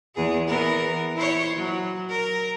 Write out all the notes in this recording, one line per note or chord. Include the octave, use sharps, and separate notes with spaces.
E2 G#4
E3 B3 A#4
E4 C5 C#5
F#3
A#4